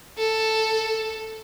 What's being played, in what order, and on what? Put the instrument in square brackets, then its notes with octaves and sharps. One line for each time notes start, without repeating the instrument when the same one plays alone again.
[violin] A4